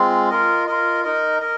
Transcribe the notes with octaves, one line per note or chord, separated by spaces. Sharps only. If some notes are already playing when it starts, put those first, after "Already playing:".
Already playing: G#3 C4 F4
F4 A#4 D#5
F4 A#4 D#5
D#4 A#4 D#5
A#4 D#5